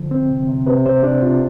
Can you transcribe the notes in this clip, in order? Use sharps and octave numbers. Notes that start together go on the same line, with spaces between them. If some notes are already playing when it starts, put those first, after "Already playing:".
Already playing: D3 F3
C4
C3
C3
C3 B4
C3 C5
C3 D4
C3 F4